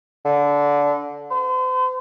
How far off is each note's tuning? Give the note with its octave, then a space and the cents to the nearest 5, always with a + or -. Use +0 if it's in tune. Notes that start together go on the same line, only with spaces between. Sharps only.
D3 -20
C5 -40